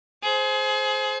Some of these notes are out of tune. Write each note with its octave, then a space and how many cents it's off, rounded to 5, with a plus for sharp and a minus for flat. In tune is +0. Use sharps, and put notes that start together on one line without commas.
G#4 +30 C5 +0